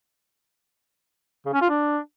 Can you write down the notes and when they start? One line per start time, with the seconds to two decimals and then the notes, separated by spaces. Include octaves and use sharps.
1.46 C#3
1.54 C#4
1.62 F4
1.69 D4